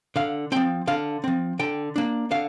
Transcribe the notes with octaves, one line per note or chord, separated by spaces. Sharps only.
D3 F5
F3 C4 G5
D3 F5
F3 C4
D3 G5
A#3 D4
D3 F5